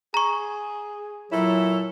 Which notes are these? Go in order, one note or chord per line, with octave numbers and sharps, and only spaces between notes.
G#4 A#5 C#6
A#2 F#3 E4 A4 C#5